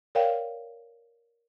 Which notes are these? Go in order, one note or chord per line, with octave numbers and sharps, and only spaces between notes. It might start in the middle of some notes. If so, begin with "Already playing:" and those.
A#4 C#5 D5 F5 G5